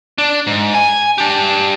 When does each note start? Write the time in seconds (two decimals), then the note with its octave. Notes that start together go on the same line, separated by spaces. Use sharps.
0.18 D4
0.47 G#2
0.74 G#5
1.18 D4 G4